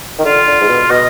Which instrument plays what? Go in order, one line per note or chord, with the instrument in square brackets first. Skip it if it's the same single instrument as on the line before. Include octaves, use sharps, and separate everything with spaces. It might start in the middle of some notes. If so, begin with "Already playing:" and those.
[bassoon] D#3
[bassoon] D3 [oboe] F4
[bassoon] D3
G#2
B2
[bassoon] B2 [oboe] D#5